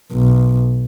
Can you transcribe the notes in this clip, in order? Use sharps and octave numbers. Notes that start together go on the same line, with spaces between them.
B1